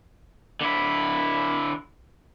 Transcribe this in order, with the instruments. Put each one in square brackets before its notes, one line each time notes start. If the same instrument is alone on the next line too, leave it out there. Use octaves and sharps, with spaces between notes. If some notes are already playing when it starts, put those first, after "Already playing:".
[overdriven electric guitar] D3 E4